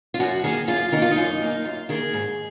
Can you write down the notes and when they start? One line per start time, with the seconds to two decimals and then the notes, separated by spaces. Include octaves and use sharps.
0.14 F4
0.19 F#2 F#4
0.44 D#3 A#3 G#4
0.67 F#2 F4
0.92 D#3 A#3 D#4
1.02 F4
1.11 D#4
1.16 F#2
1.40 D#3 A#3
1.64 F#2 F4
1.89 D#3 A#3 G#4
2.13 G#2